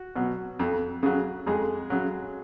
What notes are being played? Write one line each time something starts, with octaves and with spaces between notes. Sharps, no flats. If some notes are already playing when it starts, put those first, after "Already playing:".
Already playing: F#4
B2 F#3
F2
C#3 F#3
F2 G#3 G#4
C#3 F#3